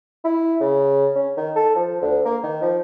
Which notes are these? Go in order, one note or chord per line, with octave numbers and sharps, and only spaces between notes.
E4
C#3
C#4
D#3
A4
F3
D2
A#3
D#3
F3